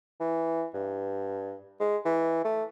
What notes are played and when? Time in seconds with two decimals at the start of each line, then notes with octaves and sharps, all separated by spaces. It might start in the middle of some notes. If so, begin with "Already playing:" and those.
0.20 E3
0.74 G2
1.80 G#3
2.05 E3
2.44 A3